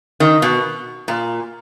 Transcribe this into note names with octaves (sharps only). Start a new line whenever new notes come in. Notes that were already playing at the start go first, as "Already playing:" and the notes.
D#3
B2
A#2